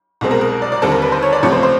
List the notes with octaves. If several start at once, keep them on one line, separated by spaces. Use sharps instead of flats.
C2 B2 G#3 C4
A#4
A#4
D5
D5
D#2 D3 G3 C4 A4
A#4
B4
C5
C#5
D5
C#2 C3 F3 A3 C#5
C5
C5